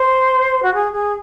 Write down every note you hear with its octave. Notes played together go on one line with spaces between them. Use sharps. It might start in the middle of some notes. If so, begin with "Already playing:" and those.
Already playing: C5
F#4
G#4
G#4